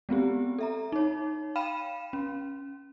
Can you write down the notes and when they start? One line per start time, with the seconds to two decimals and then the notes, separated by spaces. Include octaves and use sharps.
0.09 G#3 B3 C4 G4
0.58 A4 E5 A#5
0.92 D#4 C#5
1.56 F5 G5 B5 F6 D#7 E7
2.13 C#4